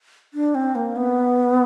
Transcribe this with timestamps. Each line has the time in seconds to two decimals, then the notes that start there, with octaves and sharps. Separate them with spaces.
0.34 D4
0.55 C4
0.75 A#3
0.96 B3